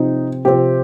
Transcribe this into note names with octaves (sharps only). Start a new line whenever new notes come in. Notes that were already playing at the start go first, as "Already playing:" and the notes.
Already playing: C3 F3 C4 D#4
C3 F3 C4 G4